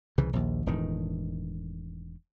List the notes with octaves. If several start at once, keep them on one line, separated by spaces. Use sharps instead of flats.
C2 C#3 E3
A#1 D#2
E1 A2 D#3